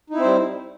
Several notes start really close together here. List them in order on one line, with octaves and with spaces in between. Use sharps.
D#4 E4 C4 C5 G3